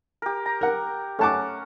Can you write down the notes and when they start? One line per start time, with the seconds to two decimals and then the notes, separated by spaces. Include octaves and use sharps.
0.22 G4 A#4
0.46 A#5
0.61 A#4 F#5
1.19 A3 C#4 F#5 A5 D6